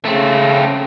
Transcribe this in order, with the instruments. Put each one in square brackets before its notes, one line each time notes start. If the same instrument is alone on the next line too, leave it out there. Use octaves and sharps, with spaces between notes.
[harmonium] C#3 [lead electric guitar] A3 C4